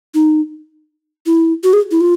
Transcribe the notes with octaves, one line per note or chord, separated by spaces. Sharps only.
D#4
E4
F#4
G#4
E4
F4